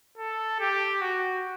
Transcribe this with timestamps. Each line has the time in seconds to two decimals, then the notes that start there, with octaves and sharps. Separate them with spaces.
0.18 A4
0.60 G4
1.02 F#4